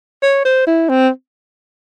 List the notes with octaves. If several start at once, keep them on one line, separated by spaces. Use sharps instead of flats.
C#5
C5
E4
C4